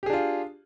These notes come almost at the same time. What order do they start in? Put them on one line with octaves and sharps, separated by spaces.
G4 G#4 D4 F4